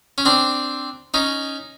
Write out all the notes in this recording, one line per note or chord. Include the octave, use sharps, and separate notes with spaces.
C#4
C4 D4
C#4 D#4